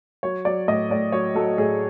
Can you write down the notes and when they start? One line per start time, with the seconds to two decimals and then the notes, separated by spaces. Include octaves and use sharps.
0.23 F#3 C#5
0.45 F#3 D5
0.68 A2 D#5
0.90 A2 D5
1.12 F#3 C#5
1.35 F#3 A4
1.57 A2 G#4